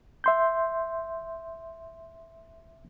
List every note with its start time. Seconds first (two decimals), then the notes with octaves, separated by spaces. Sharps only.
0.24 E5 C6 G6